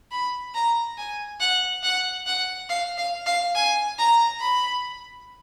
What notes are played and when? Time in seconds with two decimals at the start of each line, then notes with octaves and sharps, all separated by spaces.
0.12 B5
0.55 A#5
0.98 G#5
1.40 F#5
1.83 F#5
2.27 F#5
2.69 F5
2.98 F5
3.26 F5
3.55 G#5
3.99 A#5
4.41 B5